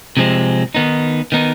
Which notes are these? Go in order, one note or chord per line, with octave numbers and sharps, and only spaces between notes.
C3 F3 G#3 C4
D#3 B3 D#4
D#3 B3 D#4